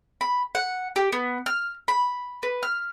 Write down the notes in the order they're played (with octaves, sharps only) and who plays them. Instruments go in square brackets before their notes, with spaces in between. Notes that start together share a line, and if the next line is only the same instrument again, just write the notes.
[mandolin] B5
F#5
G4
B3
F6
B5
B4
F6